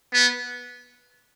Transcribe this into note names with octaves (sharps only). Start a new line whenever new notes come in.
B3